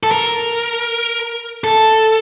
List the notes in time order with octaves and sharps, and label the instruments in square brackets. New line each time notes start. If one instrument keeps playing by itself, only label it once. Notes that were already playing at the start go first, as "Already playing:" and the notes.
[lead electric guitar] A4
A#4
A4